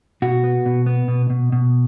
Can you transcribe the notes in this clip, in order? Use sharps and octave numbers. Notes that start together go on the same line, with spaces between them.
B2 F#4
B3
B2
B3
B2
B2
B2